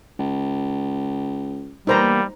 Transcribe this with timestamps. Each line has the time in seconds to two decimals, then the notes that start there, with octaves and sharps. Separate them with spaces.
0.19 C#2
1.87 E3 G3 A#3 B3 D#4 C5 A#5